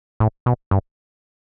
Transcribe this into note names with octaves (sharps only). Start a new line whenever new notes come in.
A2
B2
G2